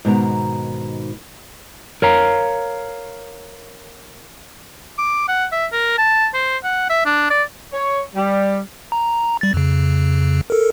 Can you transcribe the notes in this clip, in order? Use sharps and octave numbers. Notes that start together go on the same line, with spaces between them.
G#2 B2 D#3 A#5
A#4 C#5 F5 A#5
D6
F#5
E5
A#4
A5
C5
F#5
E5
D4
D5
C#5
G3
A#5
G3 A6
F2 C#3
A4 A#4